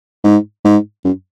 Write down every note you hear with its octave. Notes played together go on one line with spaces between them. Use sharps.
G#2
G#2
F#2